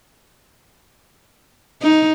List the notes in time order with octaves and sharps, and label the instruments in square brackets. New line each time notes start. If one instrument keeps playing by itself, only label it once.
[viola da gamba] D#4